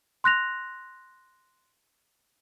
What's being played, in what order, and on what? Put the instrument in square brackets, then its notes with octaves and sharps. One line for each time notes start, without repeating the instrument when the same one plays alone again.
[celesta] C6 F#6 A#6 F7